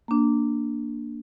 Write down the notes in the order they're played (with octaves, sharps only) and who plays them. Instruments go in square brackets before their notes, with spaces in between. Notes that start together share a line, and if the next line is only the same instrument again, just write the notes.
[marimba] A#3 D4